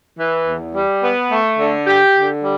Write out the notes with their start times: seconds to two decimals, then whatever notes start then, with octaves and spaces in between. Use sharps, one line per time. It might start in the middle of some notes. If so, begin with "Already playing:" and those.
0.19 E3
0.47 E2
0.75 G3
1.03 B3
1.31 A3
1.58 D3
1.87 G4
2.15 D3
2.42 G3